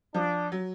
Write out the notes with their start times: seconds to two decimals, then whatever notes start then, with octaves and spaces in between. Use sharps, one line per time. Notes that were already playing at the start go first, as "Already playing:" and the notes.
0.14 F3 D4
0.52 F#3